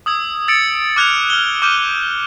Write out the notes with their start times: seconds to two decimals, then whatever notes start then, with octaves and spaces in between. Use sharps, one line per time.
0.06 D#6 E6 G#6
0.48 E6 A6 C#7 D7
0.96 D6 F6 F#6 G#6 A6 F7
1.30 F6 G7
1.62 D6 F6 G6 D#7 E7